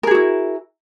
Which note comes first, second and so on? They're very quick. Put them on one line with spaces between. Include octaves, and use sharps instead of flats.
A#4 G#4 F#4 E4